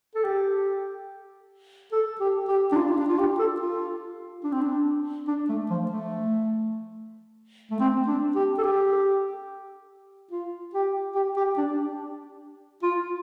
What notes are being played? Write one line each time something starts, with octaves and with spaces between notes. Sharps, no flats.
A4
G4
A4
G4
G4
D4
F4
F4
D4
F4
G4
A4
F4
D4
C4
D4
D4
A3
F3
A3
A3
C4
D4
G4
A4
G4
F4
G4
G4
G4
D4
F4